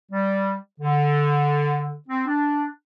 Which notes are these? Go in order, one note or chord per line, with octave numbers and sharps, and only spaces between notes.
G3
D3
C4
D4